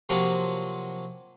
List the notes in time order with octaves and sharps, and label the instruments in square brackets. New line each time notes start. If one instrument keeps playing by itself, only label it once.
[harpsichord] C3 F3 F#3 A#3